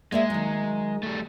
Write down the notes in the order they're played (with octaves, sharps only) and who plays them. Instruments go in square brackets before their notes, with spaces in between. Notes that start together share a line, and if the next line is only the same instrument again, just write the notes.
[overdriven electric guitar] G#3 [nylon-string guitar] A#3 D5 E5
[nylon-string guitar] D#3 F#3
[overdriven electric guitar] G3 A3